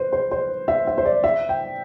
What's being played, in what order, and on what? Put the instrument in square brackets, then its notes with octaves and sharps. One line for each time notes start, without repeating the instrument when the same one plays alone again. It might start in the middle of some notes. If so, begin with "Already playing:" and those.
Already playing: [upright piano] B4 C5
C5
C5
E5
E5
C5
D5
E5
G5